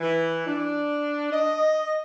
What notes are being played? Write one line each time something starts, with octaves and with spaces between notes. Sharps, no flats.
E3
D4
D#5